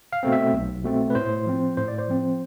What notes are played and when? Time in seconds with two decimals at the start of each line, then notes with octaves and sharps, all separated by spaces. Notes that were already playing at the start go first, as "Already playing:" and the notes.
0.13 F5
0.23 B2 A3 C4
0.32 E5
0.53 B1
0.84 B2 A3 C4
1.10 B4
1.15 A2 C5
1.46 F3 C4
1.77 A2 C5
1.88 D5
1.98 C5
2.09 F3 C4